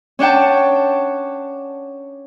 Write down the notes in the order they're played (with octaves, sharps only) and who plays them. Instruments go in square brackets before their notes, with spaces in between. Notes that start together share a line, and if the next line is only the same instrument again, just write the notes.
[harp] C#4 D4 F#5 G5 A5